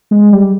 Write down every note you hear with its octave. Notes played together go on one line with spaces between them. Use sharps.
G#3
G3